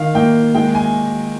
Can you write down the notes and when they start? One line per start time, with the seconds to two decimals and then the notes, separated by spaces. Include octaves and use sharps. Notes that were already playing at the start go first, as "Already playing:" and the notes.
Already playing: D#3 F5
0.15 A#3 G5
0.54 G#3 G5
0.75 G#5